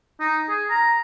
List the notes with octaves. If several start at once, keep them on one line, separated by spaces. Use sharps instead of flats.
D#4
G#4
A#5